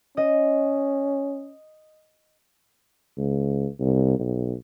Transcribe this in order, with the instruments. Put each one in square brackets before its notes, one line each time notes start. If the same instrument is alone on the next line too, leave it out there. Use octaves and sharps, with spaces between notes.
[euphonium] C#4 [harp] D#5
[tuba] C#2
C2
B1